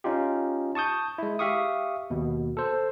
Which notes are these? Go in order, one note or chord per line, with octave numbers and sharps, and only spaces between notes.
C#4 D#4 F4 G4
A5 C#6 D#6 G6
G#3 E4
G4 E5 F5 C#6 D#6
D#2 B2
A4 C5